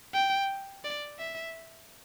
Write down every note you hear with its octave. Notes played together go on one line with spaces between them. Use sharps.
G5
D5
E5